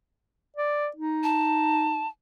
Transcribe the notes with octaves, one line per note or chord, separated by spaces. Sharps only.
D5
D#4
A5